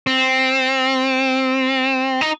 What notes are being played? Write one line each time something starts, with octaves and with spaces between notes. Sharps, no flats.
C4
D#4